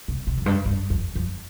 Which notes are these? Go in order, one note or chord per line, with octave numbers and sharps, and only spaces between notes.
C3
C3
F2
G2
G2
F2
F2